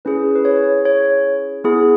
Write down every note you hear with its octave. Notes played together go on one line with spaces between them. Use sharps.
C#4 E4 G#4 B4
B4
C#5
C#5
B3 E4 G#4